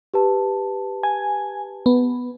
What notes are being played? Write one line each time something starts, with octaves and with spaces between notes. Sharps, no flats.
G4 B4 A5
G#5
B3